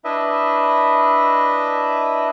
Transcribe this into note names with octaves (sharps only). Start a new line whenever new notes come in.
D4 E4 B4 D#5 E5